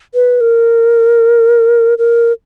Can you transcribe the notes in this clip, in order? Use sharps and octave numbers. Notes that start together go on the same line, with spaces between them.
B4
A#4
A#4